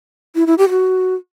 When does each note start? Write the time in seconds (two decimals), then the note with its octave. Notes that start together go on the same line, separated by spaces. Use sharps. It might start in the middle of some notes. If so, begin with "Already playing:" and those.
0.35 E4
0.47 E4
0.58 G4
0.70 F#4